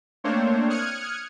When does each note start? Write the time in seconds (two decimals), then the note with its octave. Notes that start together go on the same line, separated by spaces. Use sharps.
0.24 A3 A#3 C4 D4 C5 C#5
0.70 D#6 F6 F#6 G#6 C#7